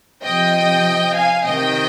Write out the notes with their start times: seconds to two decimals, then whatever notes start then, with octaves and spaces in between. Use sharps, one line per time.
0.23 C3 F3 D#5 G5
1.15 F5 G#5
1.46 C3 D#3 D#5 G5